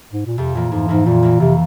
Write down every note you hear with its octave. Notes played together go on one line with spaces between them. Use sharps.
G#2
A#2
F2 C3
A#2 E3 A#3
F2 G#2
G#2 E3 A#3
F2 A#2
E3 A#3
F2 C3